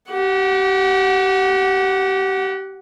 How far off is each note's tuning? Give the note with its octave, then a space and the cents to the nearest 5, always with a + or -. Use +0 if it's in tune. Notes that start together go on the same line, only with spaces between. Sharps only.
G4 -30 F#5 +0